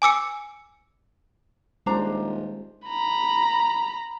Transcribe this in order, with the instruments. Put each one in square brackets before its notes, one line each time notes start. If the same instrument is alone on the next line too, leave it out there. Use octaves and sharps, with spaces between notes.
[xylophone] G#5 D6 E6 C#7
[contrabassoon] D#1 [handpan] G#3 C5 [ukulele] D4 A#5
[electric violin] A#5 B5